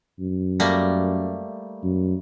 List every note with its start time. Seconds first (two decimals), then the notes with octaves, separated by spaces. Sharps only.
0.19 F#2
0.60 G3 A3 A#3
1.83 F#2